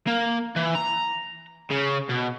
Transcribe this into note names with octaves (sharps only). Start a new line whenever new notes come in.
A#3
E3
A#5
C#3
B2